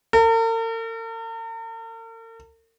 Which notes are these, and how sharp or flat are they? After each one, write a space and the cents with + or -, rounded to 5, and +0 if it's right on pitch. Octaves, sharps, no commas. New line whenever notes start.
A#4 -45